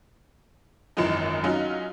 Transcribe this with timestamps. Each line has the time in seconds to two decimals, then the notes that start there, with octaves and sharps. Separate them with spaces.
0.97 G#1 F#2 E3 F3 D#4
1.44 F#3 C#4 D#4 F4